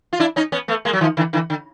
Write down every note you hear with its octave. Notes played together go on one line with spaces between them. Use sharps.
F4
D4 E4
C#4 D#4
B3 C#4
A3 B3
G#3 A#3
F#3
D#3 F3
D3 E3
D3 E3
D3